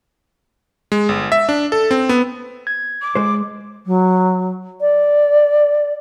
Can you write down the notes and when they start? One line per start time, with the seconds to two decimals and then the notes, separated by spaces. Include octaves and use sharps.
0.92 G#3
1.09 G1
1.32 E5
1.49 D4
1.72 A4
1.91 C4
2.09 B3
2.67 G#6
3.02 D6
3.15 G#3 C5
3.86 F#3
4.81 D5